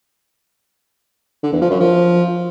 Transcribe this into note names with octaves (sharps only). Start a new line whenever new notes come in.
D3
E2
F3
F#2
F3